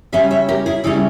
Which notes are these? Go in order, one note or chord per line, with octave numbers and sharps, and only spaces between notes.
C#3 G3 C#4 E5 G#5
C#5 E5
G4 A#4
E4 G#4
C#3 G3 C#4 E4